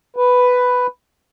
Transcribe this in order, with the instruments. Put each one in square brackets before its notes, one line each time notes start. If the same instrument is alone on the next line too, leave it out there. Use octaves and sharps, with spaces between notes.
[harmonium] B4